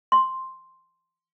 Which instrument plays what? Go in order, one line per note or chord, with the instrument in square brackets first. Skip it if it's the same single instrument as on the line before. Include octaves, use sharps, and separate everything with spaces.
[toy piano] C6